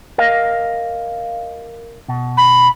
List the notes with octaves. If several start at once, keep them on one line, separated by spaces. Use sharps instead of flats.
A#4 D#5 F5
B2
B5